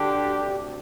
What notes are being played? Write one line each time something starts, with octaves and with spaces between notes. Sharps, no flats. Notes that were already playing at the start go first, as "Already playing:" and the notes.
Already playing: D2 D3 D4 G4
D2 C3